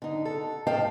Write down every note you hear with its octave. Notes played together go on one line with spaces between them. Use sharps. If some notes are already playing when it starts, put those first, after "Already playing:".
D3 D#4
A4
A2 D#5 F5 G5 A5